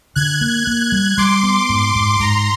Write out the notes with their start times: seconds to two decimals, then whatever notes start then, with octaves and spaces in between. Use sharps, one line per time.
0.15 D3 F#6 G#6
0.41 A#3
0.67 A#3
0.92 G3
1.18 G3 C6 D6
1.43 B3
1.69 G#2
1.95 G#2
2.20 G#2 A#5 C6